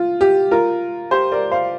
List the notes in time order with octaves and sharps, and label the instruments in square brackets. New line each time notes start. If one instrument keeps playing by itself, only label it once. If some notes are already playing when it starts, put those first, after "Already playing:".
Already playing: [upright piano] F4
G4
F4 A#4
G4 C5
A#4 D5
C5 F5